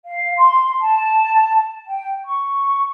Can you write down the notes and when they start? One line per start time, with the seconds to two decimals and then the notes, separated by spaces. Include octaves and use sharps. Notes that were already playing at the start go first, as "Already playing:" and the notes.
0.05 F5
0.37 C6
0.82 A5
1.87 G5
2.25 C#6